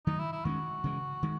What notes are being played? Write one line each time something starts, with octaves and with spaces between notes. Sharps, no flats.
D#3 F#3 A3 D#4
E4
E4
D#3 G#3 C#4 F#4
C#3 E3 G#3
D#3 G#3